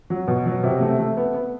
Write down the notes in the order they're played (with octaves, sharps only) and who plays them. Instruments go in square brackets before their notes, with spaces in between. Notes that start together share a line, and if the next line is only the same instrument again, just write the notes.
[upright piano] F#3
B2
F#3
C3
A3
A3
B3
B3